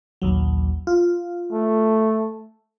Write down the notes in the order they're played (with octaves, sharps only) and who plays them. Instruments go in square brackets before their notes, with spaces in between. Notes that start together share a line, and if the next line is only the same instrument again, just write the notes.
[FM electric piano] A#1 D#2 F#3
F4
[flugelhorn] A3